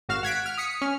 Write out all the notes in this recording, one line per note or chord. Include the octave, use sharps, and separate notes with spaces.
G#1 F#4 F5 F6 E7
F#5 G#6 B6 D7
F6
D#6 B6 C#7
C#4 F6